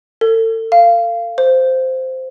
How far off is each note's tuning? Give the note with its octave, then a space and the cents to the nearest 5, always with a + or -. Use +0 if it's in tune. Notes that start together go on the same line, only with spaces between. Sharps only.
A4 +35
F5 -20
C5 -10